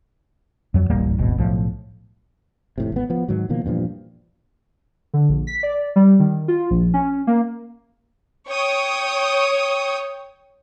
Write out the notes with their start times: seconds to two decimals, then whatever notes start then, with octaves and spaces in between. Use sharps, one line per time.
0.74 F2 F#3
0.89 D1 A1 G3 A#3
1.18 D#1 G#1 B2
1.38 B1 A2 F3
2.78 F1 A2 C3
2.92 G#1 B3
3.10 F3 B3
3.28 G#2 D#3 F#3
3.49 B2 D#3 F3 A#3
3.64 E2 G2 A#2 F3
5.14 D3
5.29 A#1
5.47 B6
5.63 D5
5.96 G3
6.20 D#3
6.48 F4
6.71 A#1
6.94 C#4
7.27 A#3
8.48 C#5 G5 D#6